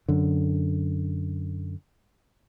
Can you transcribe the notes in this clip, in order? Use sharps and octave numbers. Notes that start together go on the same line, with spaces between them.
F#2 D3